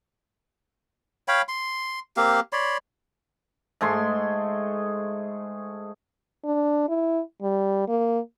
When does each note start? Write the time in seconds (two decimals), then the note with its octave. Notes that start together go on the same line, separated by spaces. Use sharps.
1.28 C#5 F5 G5 B5
1.48 C6
2.17 A#3 C4 G4 F5
2.53 C#5 D5 B5 C6
3.81 G#2 A3 G#4 C6
6.45 D4
6.89 E4
7.42 G3
7.88 A#3